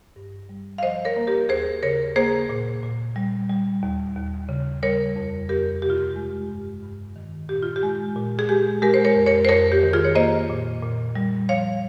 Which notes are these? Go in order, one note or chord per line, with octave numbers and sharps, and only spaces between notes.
G2
G3
F5
F3 C5 D#5
A#4 C#5
A#3
G4 A#4
D#2 G#4 C5
C#3 A#4 C#5
A#3 G#4 C5
A#2
A#2
G3
G3
D#2
D#2
C#3
G3 A#4 C#5
F2
F2 G4 A#4
C3 G4
F4
G4
G#3
G2
G2
D#3
A#2 G4
F4
G4
G#3
A#2
G#4
G#3 G4
G#3 G4 A#4
C5
A#4 C#5
F2
A#4 C#5
C5
F2 A#4 C#5
G4
D#3
F4 G#4
C#5
A#3 C5 D#5
A#2
A#2
G3
F3 C#5 F5